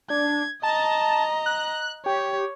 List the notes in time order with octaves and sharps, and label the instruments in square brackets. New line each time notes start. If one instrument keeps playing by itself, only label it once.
[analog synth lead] D4 [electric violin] G#6
[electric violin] D#5 A#5 [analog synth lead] A5
[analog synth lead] F#6
[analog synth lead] G4 [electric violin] C#5